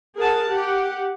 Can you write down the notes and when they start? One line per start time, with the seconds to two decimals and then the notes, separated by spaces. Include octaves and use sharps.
0.17 G#4 A#4 F#5 A5
0.49 G4 F#5